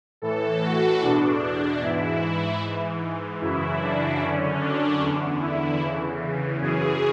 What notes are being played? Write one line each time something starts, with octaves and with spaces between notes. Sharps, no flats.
A2 E3 A4
F#4
E2 B2 D4
G#2 E3 E4
G#2 E3
F#2 C#3 E3 E4
D4
F#2 D3 C#4
D4
E2 D3
E4
E2 C#3 E3
F#2 C#3 E3 G#4